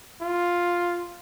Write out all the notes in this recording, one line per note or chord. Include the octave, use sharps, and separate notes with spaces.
F4